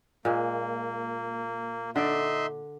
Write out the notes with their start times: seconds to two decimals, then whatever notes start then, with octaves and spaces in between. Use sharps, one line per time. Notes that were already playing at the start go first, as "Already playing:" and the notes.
0.25 A#2 G#3 A#3
1.96 D3 D#4 D5 E5 C6